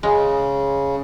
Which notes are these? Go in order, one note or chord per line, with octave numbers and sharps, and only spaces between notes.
C#3 G#3